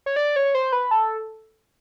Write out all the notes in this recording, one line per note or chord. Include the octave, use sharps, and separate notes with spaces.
C#5
D5
C#5
C5
B4
A4